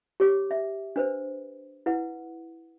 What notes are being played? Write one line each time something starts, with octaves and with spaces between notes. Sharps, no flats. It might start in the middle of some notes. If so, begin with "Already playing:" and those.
G4 C#5 D6
E5
D4 B4 C5
E4 B4 F#5